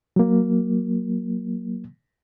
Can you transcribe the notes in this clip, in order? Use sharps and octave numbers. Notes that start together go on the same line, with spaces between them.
F#3 A#3